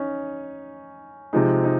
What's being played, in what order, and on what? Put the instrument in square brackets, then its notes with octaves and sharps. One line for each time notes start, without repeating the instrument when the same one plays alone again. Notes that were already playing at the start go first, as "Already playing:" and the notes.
Already playing: [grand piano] C#4 D#4
C3 F3 G#3 D#4
D#4